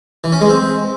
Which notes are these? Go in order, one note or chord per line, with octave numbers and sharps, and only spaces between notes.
E3
C#4
G#3
C4